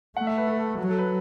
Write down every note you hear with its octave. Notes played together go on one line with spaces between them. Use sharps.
A3 F#5
E5
B4
A4
F#3 F#4
A4
B4